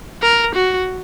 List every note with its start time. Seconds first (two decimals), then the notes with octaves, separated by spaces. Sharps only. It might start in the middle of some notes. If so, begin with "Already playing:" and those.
0.22 A#4
0.55 F#4